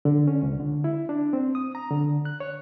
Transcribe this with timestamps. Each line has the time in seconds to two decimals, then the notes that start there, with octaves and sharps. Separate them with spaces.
0.05 D3
0.28 C#4
0.43 C#2
0.60 D3
0.84 E4
1.09 D4
1.33 C4
1.55 D#6
1.75 A#5
1.91 D3
2.25 F#6
2.40 C#5